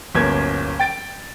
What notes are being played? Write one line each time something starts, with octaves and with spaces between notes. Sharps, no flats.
D1 G1 A#3 C#4 G#6
G5 A6 D7